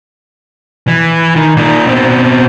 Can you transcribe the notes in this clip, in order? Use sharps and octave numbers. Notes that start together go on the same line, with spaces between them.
E3
D#3
A#2 D#4
B2 C4